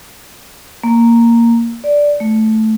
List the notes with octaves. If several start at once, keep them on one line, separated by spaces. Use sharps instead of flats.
A#3
D5
A3